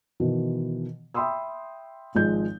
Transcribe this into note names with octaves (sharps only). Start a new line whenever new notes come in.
B2 D#3 E3
E5 G5 B5 C6 D#6 E6
G#1 F3 G#3 G6